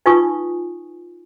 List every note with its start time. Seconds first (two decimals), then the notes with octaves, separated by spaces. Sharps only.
0.06 D#4 F4 B4 G#5 C#6 D#6